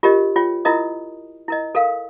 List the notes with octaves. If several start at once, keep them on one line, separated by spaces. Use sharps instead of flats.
F4 G4 A#4 C#5 D#5
F4 C#5 G5
E4 F4 A#4 D#5 D#6
E4 A#4 D#5
A4 A#4 F5